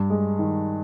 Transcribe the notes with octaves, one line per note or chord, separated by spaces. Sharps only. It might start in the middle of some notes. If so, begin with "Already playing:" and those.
Already playing: G2
G#3
D#3